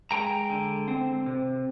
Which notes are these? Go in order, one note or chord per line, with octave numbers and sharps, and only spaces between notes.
G#3 G5 A#5
D3
C4
C3